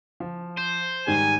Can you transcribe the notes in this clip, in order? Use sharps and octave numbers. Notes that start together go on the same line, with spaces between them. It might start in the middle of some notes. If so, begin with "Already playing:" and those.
F3
C5
G#2 D#3 G3 G#5